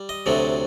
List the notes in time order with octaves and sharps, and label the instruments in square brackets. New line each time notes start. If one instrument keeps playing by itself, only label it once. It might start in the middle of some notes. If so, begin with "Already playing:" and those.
Already playing: [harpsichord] G3
D#5
D2 C3 F#3 A3